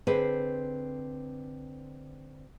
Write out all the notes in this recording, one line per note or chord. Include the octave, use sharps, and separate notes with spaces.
D3 C4 G#4 B4 C5